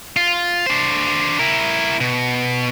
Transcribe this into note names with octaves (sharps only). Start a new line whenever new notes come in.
F4
D4 C5
E4 A#4
B2